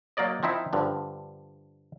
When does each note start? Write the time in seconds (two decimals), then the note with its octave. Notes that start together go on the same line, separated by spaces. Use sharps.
0.17 F#3 A#3 A#4 D5 D#5
0.43 F3 C4 D#4 E4 E5
0.73 G2 D3 F3